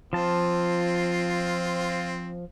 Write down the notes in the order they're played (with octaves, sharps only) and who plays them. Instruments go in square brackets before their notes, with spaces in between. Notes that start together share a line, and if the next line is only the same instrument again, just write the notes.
[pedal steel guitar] F3 A5 [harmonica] C4 F4